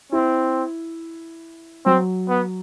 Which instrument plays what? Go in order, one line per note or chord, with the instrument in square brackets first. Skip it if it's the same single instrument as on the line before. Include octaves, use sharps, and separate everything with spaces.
[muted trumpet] C4 [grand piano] E4
[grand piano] F#3 [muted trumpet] C4
[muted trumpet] B3